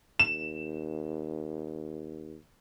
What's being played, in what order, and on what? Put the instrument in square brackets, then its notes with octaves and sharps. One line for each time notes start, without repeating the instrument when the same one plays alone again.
[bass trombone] D#2 [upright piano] E7